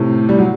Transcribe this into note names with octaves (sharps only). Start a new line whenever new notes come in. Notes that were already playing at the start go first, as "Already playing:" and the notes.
Already playing: A2 C3
G3
F#3